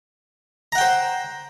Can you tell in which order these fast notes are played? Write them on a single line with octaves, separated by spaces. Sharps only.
A#5 F#5 G5 C5